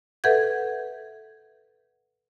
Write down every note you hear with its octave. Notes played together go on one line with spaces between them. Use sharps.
A4 B4 E5 F#5 G6 G#6